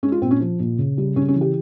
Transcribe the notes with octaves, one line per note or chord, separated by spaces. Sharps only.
G#3 C#4
F4
A#2 C4
C#4
F3
A#2
C#3
G3
C#3 C#4
C#4
E3
G4